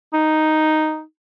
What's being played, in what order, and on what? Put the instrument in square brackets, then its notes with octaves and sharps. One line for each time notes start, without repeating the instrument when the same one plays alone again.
[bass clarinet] D#4